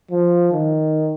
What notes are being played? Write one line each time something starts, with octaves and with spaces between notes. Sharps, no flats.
F3
D#3